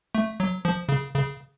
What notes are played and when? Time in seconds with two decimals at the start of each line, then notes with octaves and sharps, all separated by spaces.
0.15 A3
0.40 F#3
0.65 F3
0.89 C#3
1.15 C#3